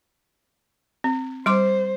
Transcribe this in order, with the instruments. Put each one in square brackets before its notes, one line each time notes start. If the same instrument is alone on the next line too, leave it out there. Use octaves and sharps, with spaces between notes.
[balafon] C4
[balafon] G3 C6 D6 [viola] C5